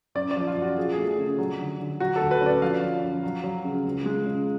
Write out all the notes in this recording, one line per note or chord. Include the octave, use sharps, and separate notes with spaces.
F#2 D5
D5
F3
F4
F#2
F#4
F3 G#4
G#4
A3
G#4
C#3
F#3
D3
D3
F#3 F#4
D2 A4
B4
C#4
D5
F3 F5
F3
F#2
F#3
F#3
C#3
C#2
G#3
C#3